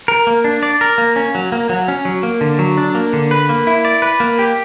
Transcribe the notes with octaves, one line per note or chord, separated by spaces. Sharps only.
A#4
A#3
D4
D5
A#4
A#3
C#4
F#3
A#3
F#3
C#4
F#3
A#3
D3
F#3
D4
A#3
D3
B4
A#3
E4
D5
B4
A#3
G4